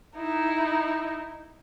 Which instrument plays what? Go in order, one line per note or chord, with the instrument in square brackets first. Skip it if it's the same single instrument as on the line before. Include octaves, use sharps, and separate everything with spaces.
[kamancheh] D#4 E4